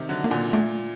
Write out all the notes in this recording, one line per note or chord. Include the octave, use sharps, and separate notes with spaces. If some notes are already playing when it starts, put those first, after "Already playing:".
Already playing: C3 D#3
D3 F#3
A#3
A#2 D3
A#2 A3